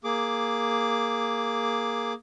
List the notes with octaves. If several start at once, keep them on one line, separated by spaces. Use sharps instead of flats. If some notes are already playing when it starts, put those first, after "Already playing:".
A#3 G#4 D6